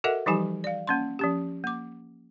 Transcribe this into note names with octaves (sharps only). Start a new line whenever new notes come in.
F#4 A4 A#4 D#5 E5 F#5
E3 F3 G3 D#4 G4 G#5
D5 F5
A#3 C#4 C6
F3 C#4 G4
A#3 D6